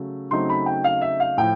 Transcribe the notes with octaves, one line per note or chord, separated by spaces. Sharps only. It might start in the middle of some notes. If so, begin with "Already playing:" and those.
Already playing: C#3 F#3 A3
C#3 F#3 A3 C4 D#4 C6
B5
G5
F5
E5
F5
A2 F3 G5